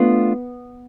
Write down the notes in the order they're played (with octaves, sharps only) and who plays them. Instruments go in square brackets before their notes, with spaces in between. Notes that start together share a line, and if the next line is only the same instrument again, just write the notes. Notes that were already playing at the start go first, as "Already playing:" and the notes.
Already playing: [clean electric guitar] A3 D4 F4 [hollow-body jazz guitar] B3